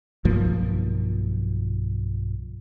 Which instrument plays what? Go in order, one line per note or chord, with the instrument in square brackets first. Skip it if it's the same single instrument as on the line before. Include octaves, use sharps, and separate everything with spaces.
[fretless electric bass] B1 G2 F3 A#3